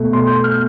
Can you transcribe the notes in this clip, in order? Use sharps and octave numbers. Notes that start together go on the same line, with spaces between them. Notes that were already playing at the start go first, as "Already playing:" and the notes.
Already playing: B2 A3
C6
G6
F6